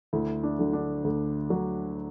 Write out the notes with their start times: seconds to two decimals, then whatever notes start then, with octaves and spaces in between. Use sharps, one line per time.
0.13 D2 E4
0.43 D4
0.59 D3 F#3
0.73 D4
1.04 D2
1.49 D3 F#3